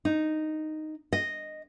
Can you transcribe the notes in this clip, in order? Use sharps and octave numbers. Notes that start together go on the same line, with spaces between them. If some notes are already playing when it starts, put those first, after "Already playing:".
D#4
D#5